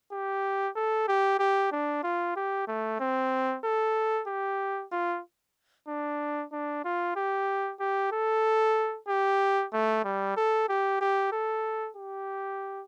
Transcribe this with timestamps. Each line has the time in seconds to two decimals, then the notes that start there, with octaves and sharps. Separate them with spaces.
0.12 G4
0.75 A4
1.08 G4
1.39 G4
1.72 D4
2.03 F4
2.36 G4
2.68 A3
3.00 C4
3.64 A4
4.27 G4
4.92 F4
5.87 D4
6.52 D4
6.84 F4
7.16 G4
7.80 G4
8.12 A4
9.08 G4
9.73 A3
10.04 G3
10.37 A4
10.69 G4
11.01 G4
11.32 A4
11.97 G4